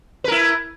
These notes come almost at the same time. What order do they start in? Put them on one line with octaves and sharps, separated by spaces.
B4 A#4 E4